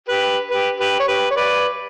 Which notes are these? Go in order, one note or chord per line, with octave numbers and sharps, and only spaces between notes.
G4 B4
G4 B4
G4 B4
C#5
G4 B4
C#5
B4 D5